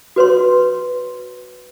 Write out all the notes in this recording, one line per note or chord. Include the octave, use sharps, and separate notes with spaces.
F#4 B4 C#5 C6